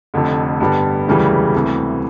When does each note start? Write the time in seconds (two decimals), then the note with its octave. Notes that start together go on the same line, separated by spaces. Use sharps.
0.14 F1 F2 D3
0.60 G2 D3 G3 B3
1.08 E1 D2 C#3 E3 G3
1.54 D2 C3 E3